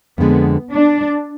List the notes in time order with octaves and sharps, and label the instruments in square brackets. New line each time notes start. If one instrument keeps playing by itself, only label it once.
[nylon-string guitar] F2 D3 G#3 [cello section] B3
[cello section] D4